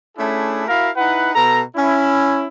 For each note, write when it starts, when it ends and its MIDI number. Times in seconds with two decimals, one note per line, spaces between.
0.17 0.64 57
0.17 0.64 61
0.17 0.64 62
0.17 0.64 64
0.17 0.64 68
0.68 0.89 64
0.68 0.89 66
0.68 0.89 70
0.68 0.89 77
0.96 1.34 63
0.96 1.34 64
0.96 1.34 71
0.96 1.34 78
1.35 1.61 47
1.35 1.61 69
1.35 1.61 82
1.76 2.48 61
1.76 2.48 64